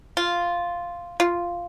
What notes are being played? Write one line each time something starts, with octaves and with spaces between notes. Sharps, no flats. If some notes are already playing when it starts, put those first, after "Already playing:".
F4
F4